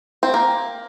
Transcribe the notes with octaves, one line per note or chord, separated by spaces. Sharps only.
C4
A#3